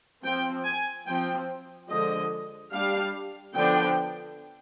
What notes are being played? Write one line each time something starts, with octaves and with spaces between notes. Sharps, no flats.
F3 C4 G5
G#5
F3 C4 G5
D3 F3 G#3 D#5
G3 D4 F5
D3 F3 B3 D4 G5